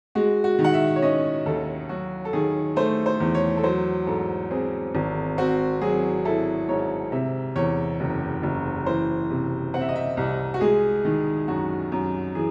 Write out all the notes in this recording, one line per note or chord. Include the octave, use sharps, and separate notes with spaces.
G#3 F#4
F#4
D#3
F#5
E5
C#5
C#4 D#5
D#2 A4
F#3 F#4
A4
D#3 G#4
A3 C5
C5
E2
C#5
A4
F#3 C5
G#2 A4
C4 G#4
G#1
C4 F#4
F#3 G#4
E4 A4
G#2 C#5
C3 E5
E2 C#5
F#1
F#1
E3 C5
C3
C4 F#5
E5
D#5
E5
C2
F#4
G#3 G#4
D#3
F#2 F#4
F#2
E3 G#4